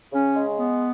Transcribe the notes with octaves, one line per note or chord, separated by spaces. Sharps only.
C#3 C#4
G#3
B3